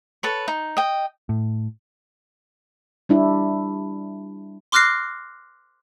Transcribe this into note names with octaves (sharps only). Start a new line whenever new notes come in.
A4 B4 C#5
D#4
D#5 G5
A2
G3 D4 E4
C6 D6 F6 F#6 A#6 C7